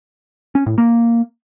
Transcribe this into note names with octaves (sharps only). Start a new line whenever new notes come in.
C#4
A2
A#3